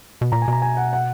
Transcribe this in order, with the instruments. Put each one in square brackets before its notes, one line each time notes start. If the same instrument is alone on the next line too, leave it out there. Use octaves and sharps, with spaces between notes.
[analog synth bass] B2
[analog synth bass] A#2 [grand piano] A#5
[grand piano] G#5
[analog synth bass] B2 [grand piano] A#5
[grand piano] G#5
F#5
F#5